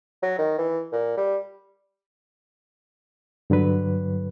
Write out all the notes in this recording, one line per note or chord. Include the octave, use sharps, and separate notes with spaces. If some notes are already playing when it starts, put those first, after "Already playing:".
F#3
D#3
E3
A#2
G3
G2 D3 F#3 B4